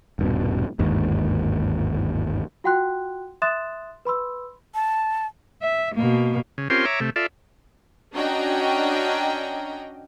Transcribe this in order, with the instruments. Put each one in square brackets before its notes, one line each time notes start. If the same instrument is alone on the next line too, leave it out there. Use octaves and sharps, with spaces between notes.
[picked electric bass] D#1 G2 B2
G1 D#2 G#2
[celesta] F4 F#4 F#5 G5 C6 F#6
E5 C6 D#6 F#6 A6 E7
B4 B5 C6 E6
[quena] A5
[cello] E5
B2 A#3
[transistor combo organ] C#3
C4 C#4 F4 G4 A#4 C6
C#5 E5 A#5 D6
C3 A3
F4 A4 D5 E5
[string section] C#4 D4 F#4 D#5 G5 A#5